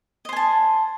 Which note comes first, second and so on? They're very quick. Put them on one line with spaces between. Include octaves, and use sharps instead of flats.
D#5 C5 G#5 A5